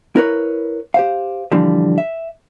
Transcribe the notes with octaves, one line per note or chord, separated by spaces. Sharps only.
E4 A#4 B4 C#5
G4 C5 F5
A#2 D3 E3 F3 G3
E5